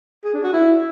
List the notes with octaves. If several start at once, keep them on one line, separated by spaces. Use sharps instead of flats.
G#4
D4
F#4
E4